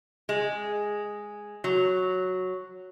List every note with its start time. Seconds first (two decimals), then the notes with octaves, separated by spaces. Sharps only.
0.29 G#3
1.64 F#3